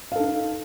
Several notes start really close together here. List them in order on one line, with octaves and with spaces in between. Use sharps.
F5 A4 D#4